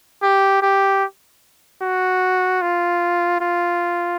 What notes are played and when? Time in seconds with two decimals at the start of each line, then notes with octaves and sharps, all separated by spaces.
0.23 G4
0.63 G4
1.82 F#4
2.62 F4
3.41 F4